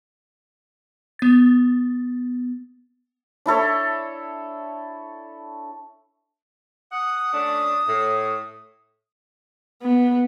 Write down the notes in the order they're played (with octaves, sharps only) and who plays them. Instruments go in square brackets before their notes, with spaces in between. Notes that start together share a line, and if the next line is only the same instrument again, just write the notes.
[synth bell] B3 A6
[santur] D4 E4 A4 C#5
[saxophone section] F#5 [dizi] D#6
[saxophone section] A3 C#4 D4
A2
[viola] B3